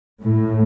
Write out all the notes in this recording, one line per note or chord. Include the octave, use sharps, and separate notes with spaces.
A2